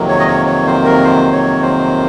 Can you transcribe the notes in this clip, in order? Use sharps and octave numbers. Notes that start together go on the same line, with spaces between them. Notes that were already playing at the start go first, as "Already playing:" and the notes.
Already playing: F2 C3 D#3 F#3 A#3
C#5
D#5
C#5
C#5
C5
A#4
C5
C#5
C5